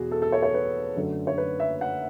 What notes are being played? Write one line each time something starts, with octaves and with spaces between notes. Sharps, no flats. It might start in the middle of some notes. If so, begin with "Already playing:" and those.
Already playing: E2 B2 F#4 G#4
A4
A4
C#5
C#5
B4
F#2 D3 A3
C#5
B4
E5
F#5